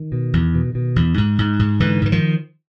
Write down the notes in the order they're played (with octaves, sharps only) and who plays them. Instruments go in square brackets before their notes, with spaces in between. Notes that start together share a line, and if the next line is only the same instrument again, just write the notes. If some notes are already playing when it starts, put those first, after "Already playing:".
Already playing: [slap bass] D#3
B2
E2
B2
B2
E2
G#2
G#2
G#2
G#2 D3 E3
G#2 E3
D#3 F3